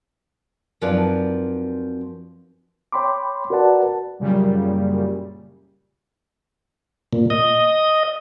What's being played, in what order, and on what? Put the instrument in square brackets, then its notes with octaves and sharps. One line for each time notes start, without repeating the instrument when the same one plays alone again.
[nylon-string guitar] F#2 F3 C4 D#4 B4 D5
[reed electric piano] C#5 G5 B5 C6 D6
F#4 A#4 B4 D5 F#5 A5
[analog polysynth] F#2 A#2 C#3 G3
[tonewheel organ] A#2
D#5